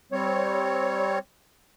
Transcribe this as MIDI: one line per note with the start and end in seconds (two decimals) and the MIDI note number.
0.12 1.19 55
0.12 1.19 60
0.12 1.19 73